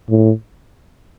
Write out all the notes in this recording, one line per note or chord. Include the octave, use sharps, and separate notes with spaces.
A2